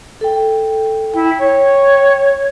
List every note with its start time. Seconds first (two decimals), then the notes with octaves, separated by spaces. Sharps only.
0.21 A4 G5
1.14 E4 G5
1.39 C#5